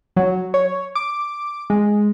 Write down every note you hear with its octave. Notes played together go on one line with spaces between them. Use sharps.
F#3
C#5
D6
G#3